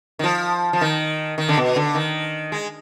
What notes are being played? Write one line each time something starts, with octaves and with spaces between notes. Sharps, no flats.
D#3
F3
F3
D#3
D#3
D3
B2
D3
D#3
G#3